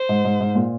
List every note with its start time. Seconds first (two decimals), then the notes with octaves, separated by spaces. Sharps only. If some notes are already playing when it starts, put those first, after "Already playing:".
Already playing: C5
0.09 G#2
0.25 G#2
0.40 G#2
0.55 A#2